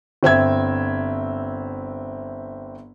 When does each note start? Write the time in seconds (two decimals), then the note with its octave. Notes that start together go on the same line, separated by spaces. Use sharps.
0.23 G1 C4 E5 G#6